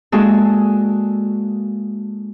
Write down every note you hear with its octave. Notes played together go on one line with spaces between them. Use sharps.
G#3 A#3 D4 F#4 G#4 A4